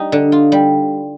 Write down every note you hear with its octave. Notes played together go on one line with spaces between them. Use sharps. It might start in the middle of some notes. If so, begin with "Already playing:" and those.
Already playing: G3 D#4
D3
F4
G3